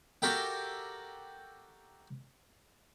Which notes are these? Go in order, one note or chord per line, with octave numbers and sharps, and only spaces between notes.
F#4 G4 A4 A#4 E5 G5